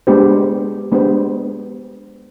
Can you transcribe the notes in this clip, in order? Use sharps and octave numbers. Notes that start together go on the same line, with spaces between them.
G#3 B3 D4 G4 C5
G#3 B3 D4 G4 C5